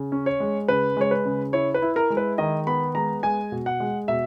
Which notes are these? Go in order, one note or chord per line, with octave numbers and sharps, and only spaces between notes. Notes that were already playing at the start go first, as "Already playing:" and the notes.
Already playing: C#3
C#4
C#5
G#3
C#3 B4
G#3 C#5
B4
C#3
E4 C#5
B4
E4
A#4
G#3
B4
D#3 D#5
B3 B5
G#3 A#5
G#3 G#5
B2
F#5
G#3
B2 E5